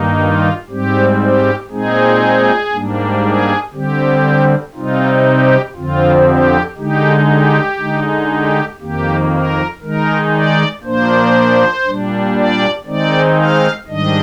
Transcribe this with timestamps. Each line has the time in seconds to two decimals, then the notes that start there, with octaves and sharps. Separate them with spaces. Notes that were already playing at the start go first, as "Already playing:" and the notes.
Already playing: G2 D#3 A#3 D#4
0.18 F4
0.70 G#2 G3 C4 G4
1.20 G4
1.70 A#2 G#3 C4 D#4 G#4
2.72 G#2 G3 A#3 D4
3.23 G#4
3.73 D3 G3 C4 G4
4.75 C3 G3 C4 D#4 F4
5.26 G4
5.76 F2 D3 F3 C4 F4
6.27 G4
6.78 D3 G#3 D#4 G4
7.29 G4
7.79 D3 G#3 D#4
8.29 G4
8.81 F2 D#3 A#3 G4
9.32 A#4
9.82 D#3 G#3 D#4 A#4
10.33 D5
10.83 A#2 F3 A#3 D4 C5
11.85 A#2 G3 D4
12.35 D5
12.86 D#3 G#3 C4 D#4 D5
13.37 F5
13.88 G#2 D#3 G3 D4 D#5